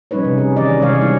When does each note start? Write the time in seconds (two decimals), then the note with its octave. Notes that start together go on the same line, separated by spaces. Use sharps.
0.11 F3 G3 C#4 D#4 B4 C#5
0.24 C3
0.38 G#4
0.56 D#3 E3 C#4 G#4 D5 D#5
0.79 C3 D#3 G#3 G#4 C#5 F5
1.01 G3 C4 D#4 E4